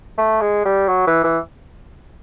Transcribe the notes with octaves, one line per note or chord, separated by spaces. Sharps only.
A3
G#3
G3
F#3
E3
E3